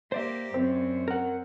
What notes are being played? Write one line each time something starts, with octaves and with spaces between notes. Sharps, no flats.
A#3 G4 C5 D5 E5
F#2 C4
A#4 F#5